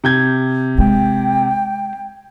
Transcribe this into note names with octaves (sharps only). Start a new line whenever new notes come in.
C3 G6 G#6
G#3 G5